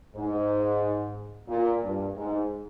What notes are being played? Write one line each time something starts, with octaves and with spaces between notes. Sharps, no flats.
G#2
A#2
G2
G#2